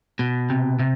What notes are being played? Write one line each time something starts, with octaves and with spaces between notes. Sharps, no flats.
B2
C3
C3